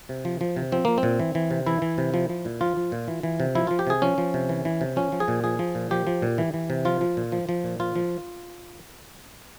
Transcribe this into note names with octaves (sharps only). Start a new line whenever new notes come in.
C3
F3
F3
C3
F3 C4
F3 A#3
C4
A#2
E3
E3
C3
E3 E4
E3
C3
F3
F3
A#2
F3 F4
F3
A#2
E3
E3
C3
F3 E4
F3 F4
G4
C3 G#4
F3 C#4
F3
C3
E3
E3
C3
F3 C#4
F3
G#4
A#2
F3 G#4
F3
A#2
F3 G4
F3
A#2
E3
E3
C3
F3 F4
F3
A#2
F3
F3
A#2
F3 F4
F3